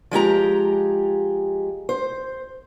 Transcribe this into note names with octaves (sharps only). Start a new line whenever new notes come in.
F3 G#3 G4 A#5
C5